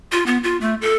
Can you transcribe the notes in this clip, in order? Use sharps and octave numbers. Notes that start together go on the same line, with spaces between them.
F4
B3
F4
A3
A4